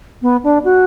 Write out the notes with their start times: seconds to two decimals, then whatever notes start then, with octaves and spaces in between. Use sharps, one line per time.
0.22 B3
0.44 D4
0.65 F#4